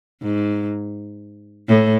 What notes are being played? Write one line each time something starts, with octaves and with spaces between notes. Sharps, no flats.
G#2
A2